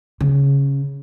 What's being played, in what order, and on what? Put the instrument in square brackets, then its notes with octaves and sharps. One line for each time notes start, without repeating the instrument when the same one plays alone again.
[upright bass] C#3